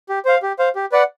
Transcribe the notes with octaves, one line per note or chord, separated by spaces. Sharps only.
G4
C5 F5
G4
C5 F5
G4
B4 D5 F#5